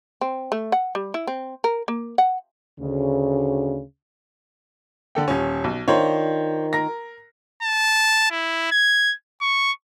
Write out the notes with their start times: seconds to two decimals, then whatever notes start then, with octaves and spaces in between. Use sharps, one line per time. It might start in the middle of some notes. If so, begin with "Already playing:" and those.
0.21 C4
0.52 A3
0.72 F#5
0.95 G3
1.14 E4
1.27 C4
1.64 A#4
1.88 A#3
2.18 F#5
2.79 D2 C#3
5.15 D3 A4 G5
5.28 D#1 C#4
5.64 B1
5.88 D#3 D4 D#4 F4 C5 C#5
6.73 A#4 A#6
7.63 A5
8.31 E4
8.72 G#6
9.41 C#6